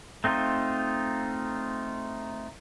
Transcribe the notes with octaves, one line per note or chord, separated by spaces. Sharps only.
A3 C4 D#4 F4